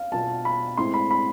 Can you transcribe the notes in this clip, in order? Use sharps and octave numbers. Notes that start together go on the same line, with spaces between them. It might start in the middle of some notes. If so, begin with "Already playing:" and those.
Already playing: F5
B2 B3 F4 A5
B5
A2 G#3 C4 E4 G#4 C6
B5
B5